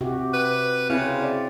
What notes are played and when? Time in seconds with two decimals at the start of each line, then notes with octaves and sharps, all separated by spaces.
0.01 C3 F#4 G4
0.33 B4
0.90 C#3 C4 E4
1.22 D5